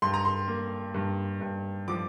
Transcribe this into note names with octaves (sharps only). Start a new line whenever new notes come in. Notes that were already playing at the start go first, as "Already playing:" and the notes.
G2 C6
A#5
C6
A#3
G2
G2
F3 D6